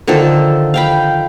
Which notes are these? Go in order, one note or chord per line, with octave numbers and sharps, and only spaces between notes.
D3 D#3 F3 A4
F5 G5 B5